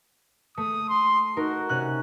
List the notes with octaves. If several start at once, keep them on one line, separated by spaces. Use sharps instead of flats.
A3 D#6
C6
D#4 F#4 A#4
C3 C#4 F#6